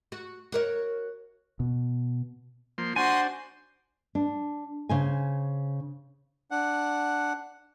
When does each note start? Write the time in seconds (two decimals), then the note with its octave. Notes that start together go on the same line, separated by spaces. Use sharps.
0.12 F#4
0.52 F#4 A#4 C#5
1.60 B2
2.78 F3 A#3 C6
2.96 D4 F#4 C5 G#5 C6
4.15 D4
4.89 C#3 C5 G#5
6.51 D4 F#5